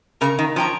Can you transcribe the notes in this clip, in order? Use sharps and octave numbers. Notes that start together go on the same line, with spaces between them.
C#3 A#4 F5 A#5 C#6
D#3
F3 C#5 G5 A#5 C#6